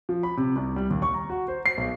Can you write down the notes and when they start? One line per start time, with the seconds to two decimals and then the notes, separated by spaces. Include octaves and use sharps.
0.09 F3
0.23 B5
0.37 C3
0.56 C2
0.76 G3
0.90 D#2
1.02 C#6
1.14 A#5
1.30 F#4
1.48 C5
1.66 C7
1.77 B1